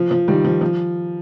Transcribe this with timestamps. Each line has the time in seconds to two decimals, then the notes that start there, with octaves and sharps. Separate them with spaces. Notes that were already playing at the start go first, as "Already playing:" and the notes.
Already playing: F3
0.11 F3
0.28 D#3 G3
0.44 F3
0.61 F3